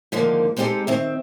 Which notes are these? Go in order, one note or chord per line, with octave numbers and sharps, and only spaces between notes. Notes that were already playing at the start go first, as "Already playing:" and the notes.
G#2 D3 D#3 F3 A#3
G#3 C4 D#4 F4 G4 A4
D#3 C4 E5